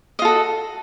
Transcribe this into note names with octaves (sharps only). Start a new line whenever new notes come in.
F4 F#4 A4 D#5